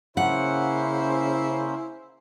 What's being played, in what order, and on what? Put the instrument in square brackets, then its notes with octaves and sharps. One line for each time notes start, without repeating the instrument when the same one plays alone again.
[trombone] C#3 [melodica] A#3 C#4 [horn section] E4 C5 [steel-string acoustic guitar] F#5